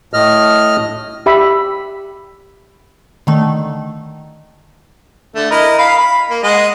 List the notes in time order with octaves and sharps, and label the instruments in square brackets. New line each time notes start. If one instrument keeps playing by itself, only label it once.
[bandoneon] A2 D#5 F6
[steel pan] G4 E5 B5
[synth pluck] D3 D#3 A3
[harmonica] D3 A3
E4 A#4 D#5
F5 B5
B5
A#3
G#3 D#5 F#5